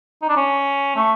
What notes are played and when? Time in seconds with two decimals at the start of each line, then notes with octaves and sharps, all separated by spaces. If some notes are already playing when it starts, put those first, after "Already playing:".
0.22 D#4
0.29 D4
0.36 C#4
0.96 A3